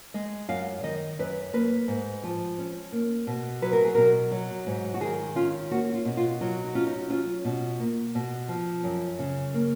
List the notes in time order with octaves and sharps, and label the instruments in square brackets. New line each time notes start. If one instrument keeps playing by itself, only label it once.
[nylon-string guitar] G#3 D#5
F#2 F5
D#3 D#5
F#2 B4
A#3 B4
G#2
F3
C#4
A#3
B2
F#3 B4
A#4
G#4
B2 A#4
F#3
G#2
F#4
D#3 G#4
C#4 F4
A#3 F#4
F4
B2
F4
F#3 F4
D#4
C#4 F4
D#4
C#4 F4
B2
A#3
B2
F3
F#2
C#3
A#3